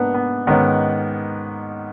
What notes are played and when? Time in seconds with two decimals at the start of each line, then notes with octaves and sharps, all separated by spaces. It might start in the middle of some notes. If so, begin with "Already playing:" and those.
Already playing: G#2 A#3 B3 D4
0.14 B3
0.47 G#2 D#3 B3 C#4